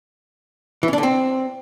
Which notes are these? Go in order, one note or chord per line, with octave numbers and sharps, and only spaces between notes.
E3
C#4
D4
D3
C4